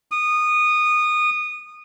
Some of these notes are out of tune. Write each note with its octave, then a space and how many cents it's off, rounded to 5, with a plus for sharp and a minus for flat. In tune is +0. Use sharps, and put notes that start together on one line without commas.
D#6 -20